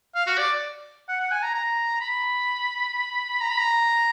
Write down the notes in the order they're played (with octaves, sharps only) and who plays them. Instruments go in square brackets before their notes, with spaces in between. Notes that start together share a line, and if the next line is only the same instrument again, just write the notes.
[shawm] F5
F#4
D5
F#5
F#5
G#5
A#5
A#5
B5
A#5
B5
A#5